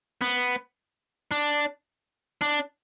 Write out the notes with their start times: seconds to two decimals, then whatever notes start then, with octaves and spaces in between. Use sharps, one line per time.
0.21 B3
1.31 D4
2.41 D4